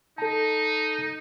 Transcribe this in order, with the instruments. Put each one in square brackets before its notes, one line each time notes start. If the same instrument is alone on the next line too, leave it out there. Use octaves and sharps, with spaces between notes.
[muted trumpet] D#4 [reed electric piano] A4 A5